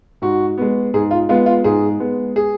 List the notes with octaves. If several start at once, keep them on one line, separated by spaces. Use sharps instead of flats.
G#2 F#4
G#3 B3
G#2 G#4
F4
G#3 B3 F4
F4
G#2 G#4
G#3 B3
G#4